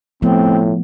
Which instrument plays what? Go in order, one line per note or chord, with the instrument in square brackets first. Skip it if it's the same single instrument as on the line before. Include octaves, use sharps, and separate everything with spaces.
[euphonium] A2 [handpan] F3 A3 B3 [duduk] C4